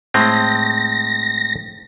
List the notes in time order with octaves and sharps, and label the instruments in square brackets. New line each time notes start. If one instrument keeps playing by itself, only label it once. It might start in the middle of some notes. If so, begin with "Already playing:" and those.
[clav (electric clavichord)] A2 G#3 C4 [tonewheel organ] A#6